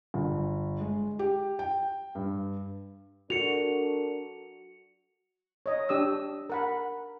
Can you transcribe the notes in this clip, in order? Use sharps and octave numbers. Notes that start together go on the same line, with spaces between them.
G1
G#3
G4
G5
G2
D4 F#4 A4 A#4 C#7 F7
C#5 D#5
D4 G4 D#6 E6
A#4 F#5 B5